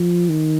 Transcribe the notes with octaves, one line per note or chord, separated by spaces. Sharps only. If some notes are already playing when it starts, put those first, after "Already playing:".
Already playing: F3
D#3